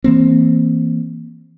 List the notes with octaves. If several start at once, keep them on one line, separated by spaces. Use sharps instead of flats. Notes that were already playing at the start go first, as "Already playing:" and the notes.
E3 A#3 C4